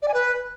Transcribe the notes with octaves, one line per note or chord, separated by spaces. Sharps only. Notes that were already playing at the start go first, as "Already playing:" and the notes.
D5
G#5
B4